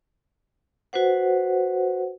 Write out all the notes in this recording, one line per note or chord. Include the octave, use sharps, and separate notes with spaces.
F#4 B4 C5 F#5